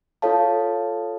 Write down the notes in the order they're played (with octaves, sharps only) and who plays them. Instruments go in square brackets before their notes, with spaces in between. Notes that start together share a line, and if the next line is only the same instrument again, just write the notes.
[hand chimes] F4 A4 C#5 F5 A5